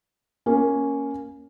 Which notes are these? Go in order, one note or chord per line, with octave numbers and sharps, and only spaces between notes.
A#3 C#4